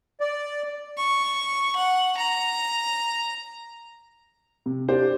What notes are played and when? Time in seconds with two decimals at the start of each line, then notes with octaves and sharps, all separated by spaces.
0.21 D5
0.97 C#6
1.76 F#5
2.17 A#5
4.66 C3
4.88 D4 G4 C5